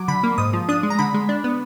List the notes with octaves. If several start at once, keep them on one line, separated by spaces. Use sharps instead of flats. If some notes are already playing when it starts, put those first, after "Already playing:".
Already playing: F#3 D6
D3 B5
A#3
G#2 D#6
F3
D4 D#6
G#3
A#5
D3 B5
G#3
D4
B3